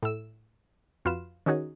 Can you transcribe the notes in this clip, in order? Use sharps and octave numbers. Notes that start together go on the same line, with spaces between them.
A2 E6
F2 F4 F#4 B4 E7
D#3 C#4 D#4 F#4 G#4